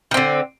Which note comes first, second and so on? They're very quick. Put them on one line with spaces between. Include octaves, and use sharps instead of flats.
D#3 C4 D3